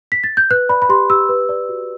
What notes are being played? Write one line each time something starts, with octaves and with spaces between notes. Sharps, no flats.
B6
A6
G6
B4 F#6
D5 B5
B5
G4 C6
G4 E6
B4
D5
F#4